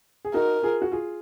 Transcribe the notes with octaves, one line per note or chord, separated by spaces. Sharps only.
G#4
D#4 F#4 A#4
F4 G#4
F#4
F4 G#4